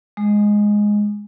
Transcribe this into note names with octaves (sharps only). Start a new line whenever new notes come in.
G#3